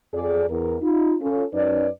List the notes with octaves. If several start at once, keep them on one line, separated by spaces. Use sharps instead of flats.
F2 G#4 D5
E2 A#4
D#4 F4
C#4 F4 A4
F#2 C#4 D#4 B4 D5